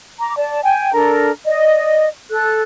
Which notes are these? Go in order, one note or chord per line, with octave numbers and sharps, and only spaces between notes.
A#5 D6
D5 A5
G5 G#5
D4 A4 A#4 A#5
D5 D#5
A4 F#6